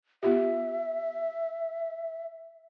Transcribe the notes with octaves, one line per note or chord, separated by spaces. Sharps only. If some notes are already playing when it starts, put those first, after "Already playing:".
B3 F4 G4 E5